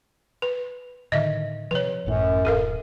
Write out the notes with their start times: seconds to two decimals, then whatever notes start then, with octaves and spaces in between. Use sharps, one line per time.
0.42 B4
1.12 A2 D3 D#3 D#5 E5
1.71 C3 F3 B4 C#5
2.06 G#1 F#2 A2
2.45 D1 A4 A#4 F5